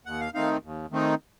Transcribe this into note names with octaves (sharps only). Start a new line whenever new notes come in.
D#2 F#5
F5
D#3 A3 C4 D#4 F5
D#2
D#3 A3 C4 D#4